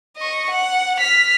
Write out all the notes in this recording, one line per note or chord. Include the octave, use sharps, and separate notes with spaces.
D#5 C#6
F#5
F6 B6